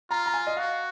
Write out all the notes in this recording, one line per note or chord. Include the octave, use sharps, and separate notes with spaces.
F4 A#5
A#5
G#5
D#5
F#4 F5